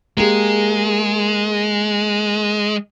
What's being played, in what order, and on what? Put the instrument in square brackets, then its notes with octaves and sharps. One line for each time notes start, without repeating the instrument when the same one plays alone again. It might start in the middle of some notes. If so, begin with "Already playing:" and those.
[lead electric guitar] G#3 [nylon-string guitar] A#3 G4 G#4